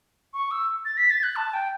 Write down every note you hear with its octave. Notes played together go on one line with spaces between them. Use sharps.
C#6
E6
A6
B6
A6
F#6
A5
G5